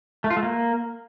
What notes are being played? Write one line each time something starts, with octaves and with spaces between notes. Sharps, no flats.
A3
F4
A3
A#3